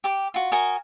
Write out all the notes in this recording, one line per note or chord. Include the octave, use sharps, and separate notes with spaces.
G4 D6
F4 F#4
F#4 A#4 D#5 G#5